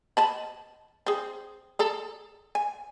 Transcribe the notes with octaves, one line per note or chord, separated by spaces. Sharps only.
D#5 A5 B5
C4 G#4
G#4 A4 A#5
G#5